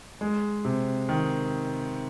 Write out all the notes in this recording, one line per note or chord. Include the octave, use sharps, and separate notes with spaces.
G#3
C3
D#3